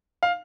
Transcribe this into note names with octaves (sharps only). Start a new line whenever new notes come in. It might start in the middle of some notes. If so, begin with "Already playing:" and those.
F5